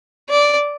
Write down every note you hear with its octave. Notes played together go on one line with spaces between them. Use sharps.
D5